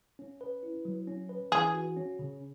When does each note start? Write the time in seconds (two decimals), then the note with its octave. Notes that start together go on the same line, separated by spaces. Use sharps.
0.19 C#4
0.41 B4
0.63 E4
0.85 F#3
1.07 C#4
1.29 B4
1.52 E3 G#4
1.74 F#4
1.96 C#4
2.19 C#3